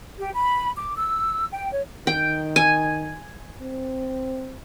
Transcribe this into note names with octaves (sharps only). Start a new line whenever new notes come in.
G4
B5
D6
E6
G5
C#5
D#3 G5
G#5
C4